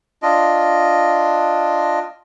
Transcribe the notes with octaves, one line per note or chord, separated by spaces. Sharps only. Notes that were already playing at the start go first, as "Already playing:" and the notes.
D4 F4 D#5